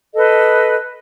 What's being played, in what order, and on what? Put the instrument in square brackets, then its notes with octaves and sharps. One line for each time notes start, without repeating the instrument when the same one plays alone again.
[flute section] A4 B4 D#5